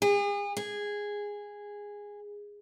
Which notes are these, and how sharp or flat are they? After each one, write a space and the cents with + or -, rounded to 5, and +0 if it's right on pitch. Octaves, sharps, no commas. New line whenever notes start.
G#4 -40
G#4 -10